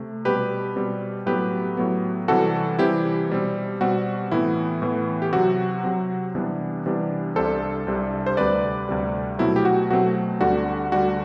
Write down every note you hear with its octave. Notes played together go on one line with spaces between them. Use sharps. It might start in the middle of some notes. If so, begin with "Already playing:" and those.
Already playing: C3 A3
B2 G3 C4 G4 B4
B2 G3 C4
A2 F#3 B3 G4 B4
A2 F#3 B3
C3 E3 G3 C4 F#4 A4
C3 E3 G3 C4 E4 G4
B2 G3 C4
B2 G3 C4 F#4
A2 E3 B3 E4
A2 E3 B3
G4
C3 F#3 C4 F#4
C3 F#3 C4
C3 E3 G3 B3 D4
C3 E3 G3 B3 D4
C2 C3 G3 D4 A4 C5
C2 C3 G3 D4
C5
D2 C3 G3 B4 D5
D2 C3 G3
B2 F#3 A3 C4 E4
G4
F#4
B2 F#3 A3 C4 F#4
D2 D3 G3 D4 F#4
D2 D3 G3 D4 F#4